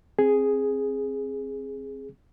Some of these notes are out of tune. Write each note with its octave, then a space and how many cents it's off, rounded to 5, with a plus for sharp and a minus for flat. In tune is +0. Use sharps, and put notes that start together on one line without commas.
C4 +20 G#4 +0